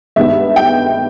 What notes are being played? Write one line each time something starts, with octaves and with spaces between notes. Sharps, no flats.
G2 D#3 G#3 B3 E5
G5